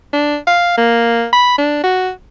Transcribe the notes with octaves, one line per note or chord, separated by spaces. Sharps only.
D4
F5
A#3
B5
D4
F#4